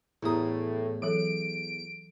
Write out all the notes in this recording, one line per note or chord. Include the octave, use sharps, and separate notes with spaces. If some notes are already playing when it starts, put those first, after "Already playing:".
E2 A2 E4 G4 A#5 D#6
E3 F#3 A4 D7